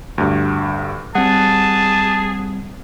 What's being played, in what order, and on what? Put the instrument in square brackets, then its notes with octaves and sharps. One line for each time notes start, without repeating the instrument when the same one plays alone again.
[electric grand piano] D2 G2
[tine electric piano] G3 C4 [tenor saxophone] G#4 [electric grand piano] F#5 [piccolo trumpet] A5